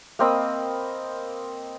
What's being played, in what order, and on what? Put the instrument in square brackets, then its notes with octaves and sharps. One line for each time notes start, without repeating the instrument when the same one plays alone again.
[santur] A#3 C4 D#5 B5